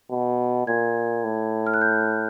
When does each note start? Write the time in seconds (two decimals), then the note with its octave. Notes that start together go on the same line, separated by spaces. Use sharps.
0.11 B2
0.67 A#2 G#6
1.24 A2
1.66 F6
1.74 F#6
1.81 G6